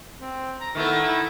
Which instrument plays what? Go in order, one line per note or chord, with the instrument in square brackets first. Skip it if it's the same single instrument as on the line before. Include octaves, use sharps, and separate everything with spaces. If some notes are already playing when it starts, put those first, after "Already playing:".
[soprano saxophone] C4
A#5
[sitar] D#3 A3 B3 [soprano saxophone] E4
[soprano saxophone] E4